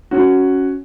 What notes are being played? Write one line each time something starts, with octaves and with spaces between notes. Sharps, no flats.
C#4 F#4